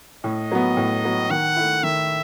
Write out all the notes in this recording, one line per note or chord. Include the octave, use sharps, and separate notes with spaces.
A2 D#5
F#3 B3
A2
F#3 B3
D#3 F#5
A3 E4
D#3 E5